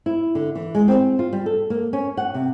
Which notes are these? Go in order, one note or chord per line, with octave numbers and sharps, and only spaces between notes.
E4
D3
E3
G#3
C4
F4
G3
A4
A#3
C#4
F#5
C3